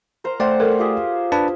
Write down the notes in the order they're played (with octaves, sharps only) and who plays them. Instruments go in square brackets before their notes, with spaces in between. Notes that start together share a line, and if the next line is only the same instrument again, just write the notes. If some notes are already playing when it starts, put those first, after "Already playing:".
[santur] A#4 C5 A#5
[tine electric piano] A3 D5 G5 [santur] C5 F#5
[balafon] A4 A#4
[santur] F4 G4 G#4
[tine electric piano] D4 B4 A5